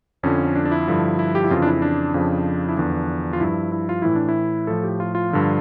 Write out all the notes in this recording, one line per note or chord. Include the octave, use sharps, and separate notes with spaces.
F2 D3 F3 C#4
D4
D4
E4
G2 D3 F3
E4
G4
E4
F2 C#3 E3 F4
D4
E4
D4
F2 C#3 F3
E4
E2 D3 F3 D4
F4
G2 F3 E4
E4
F4
A2 E3 E4
D4
E4
A2 F3 A4
G4
F4
F4
G2 D3 F3